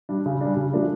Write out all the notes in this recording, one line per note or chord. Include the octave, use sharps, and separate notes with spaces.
G3 D4
C#3
G3 D4
C#3
F3 A3 D4